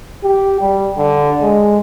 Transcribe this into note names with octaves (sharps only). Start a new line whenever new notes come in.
G4
G3
D3
G#3